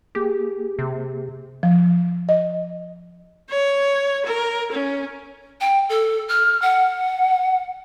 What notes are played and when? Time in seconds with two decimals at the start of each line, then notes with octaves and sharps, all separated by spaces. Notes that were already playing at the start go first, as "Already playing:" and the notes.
0.15 A#3 G4 G#4
0.79 C3
1.63 F3
2.29 D#5
3.50 C#5
4.25 A#4
4.72 C#4
5.60 G5
5.89 A4
6.28 F6
6.61 F#5